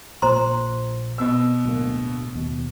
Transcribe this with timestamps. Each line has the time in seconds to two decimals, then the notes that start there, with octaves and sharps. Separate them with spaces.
0.22 A#1 A#2 C5 A#5 C6
1.18 B2 B3 E6
1.65 D1 D2 A#3
2.35 D#2 B2